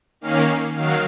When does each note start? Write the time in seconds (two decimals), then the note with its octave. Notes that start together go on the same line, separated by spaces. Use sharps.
0.21 D#3 A#3 C#4 F5
0.76 D#3 F#3 F5